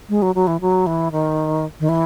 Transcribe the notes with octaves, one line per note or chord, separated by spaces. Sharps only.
G#3
F#3
F#3
E3
F#3
E3
D#3
D#3
E3